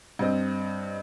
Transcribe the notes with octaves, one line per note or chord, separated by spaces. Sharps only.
G2 C4 D#5